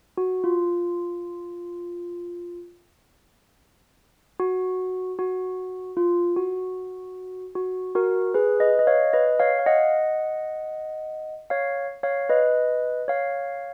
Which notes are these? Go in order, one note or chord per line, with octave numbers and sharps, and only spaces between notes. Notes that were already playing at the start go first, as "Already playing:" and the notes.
F#4
F4
F#4
F#4
F4
F#4
F#4
F#4 A#4
G#4 B4
B4 D#5
D#5
C#5 F5
B4 D#5
C#5 F5
F5
D#5 F#5
C#5 F5
C#5 F5
B4 D#5
C#5 F5